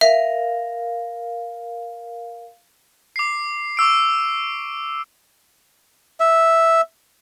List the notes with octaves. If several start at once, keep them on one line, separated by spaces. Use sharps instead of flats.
A#4 E5 F5
D6 C7
C#6 D6 E6 D7
E5